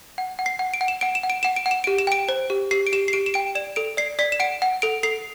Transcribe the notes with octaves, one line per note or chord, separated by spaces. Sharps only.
F#5
F#5
C7
F#5
D7
F#5
E7
F#5 D7
E7
F#5
D7
F#5 E7
D7
F#5
E7
G4 D7
E7
G5 D7
C5
G4
G4 C7
D7
G4 E7
C7
G4 D7
E7
G5 D7
D5 E7
A4 D7
D5 C7
D5 B6
E7
F#5 D7
F#5
A4 D7
A4 C7